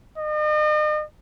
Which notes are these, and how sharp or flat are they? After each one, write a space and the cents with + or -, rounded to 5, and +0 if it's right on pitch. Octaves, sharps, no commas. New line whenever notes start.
D#5 -40